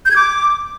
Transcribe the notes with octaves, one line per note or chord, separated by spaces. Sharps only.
G6
G#6
D6